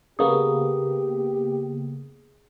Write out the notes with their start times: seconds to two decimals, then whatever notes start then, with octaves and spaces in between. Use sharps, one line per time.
0.19 C#3 A#3 B3 G4 G#4 D#6